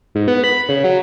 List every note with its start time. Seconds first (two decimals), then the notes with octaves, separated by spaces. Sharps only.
0.15 G#2
0.28 B3
0.44 B5
0.69 C#3
0.84 F#3